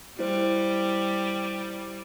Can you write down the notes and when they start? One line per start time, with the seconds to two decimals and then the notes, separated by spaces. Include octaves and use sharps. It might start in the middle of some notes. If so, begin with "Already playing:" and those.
0.19 G3 E4 C5